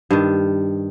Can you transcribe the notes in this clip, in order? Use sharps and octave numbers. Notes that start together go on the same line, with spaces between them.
G2 D#3